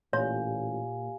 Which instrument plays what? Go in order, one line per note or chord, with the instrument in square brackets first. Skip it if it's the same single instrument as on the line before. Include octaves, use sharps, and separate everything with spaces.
[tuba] A1 [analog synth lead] A#2 [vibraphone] G4 F5 G#5 [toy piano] C#5